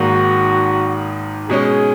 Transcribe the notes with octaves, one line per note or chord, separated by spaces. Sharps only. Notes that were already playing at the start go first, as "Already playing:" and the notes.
Already playing: G#1 G#2 D#3 A#3 F#4
B2 G#3 C#4 G#4